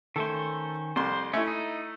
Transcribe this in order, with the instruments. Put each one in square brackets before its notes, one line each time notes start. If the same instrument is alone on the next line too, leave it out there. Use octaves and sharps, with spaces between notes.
[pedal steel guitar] D#3 C#4 C5 [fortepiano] A3 A4
[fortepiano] C2 F2 C6 [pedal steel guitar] C5
[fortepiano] A3 E4 [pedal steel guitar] C#4
[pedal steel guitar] D#4